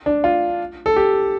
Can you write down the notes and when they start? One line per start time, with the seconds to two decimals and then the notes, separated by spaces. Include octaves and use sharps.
0.06 D4
0.24 F4
0.86 A4
0.96 G4